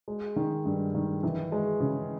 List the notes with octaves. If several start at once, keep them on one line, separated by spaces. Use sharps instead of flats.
G#3
D#3
G2
D#3
E3
G#3
C#3